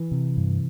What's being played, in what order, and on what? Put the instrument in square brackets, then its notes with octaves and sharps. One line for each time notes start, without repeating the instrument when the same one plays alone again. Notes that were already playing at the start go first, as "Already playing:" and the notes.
Already playing: [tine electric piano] E3
[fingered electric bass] C3
G2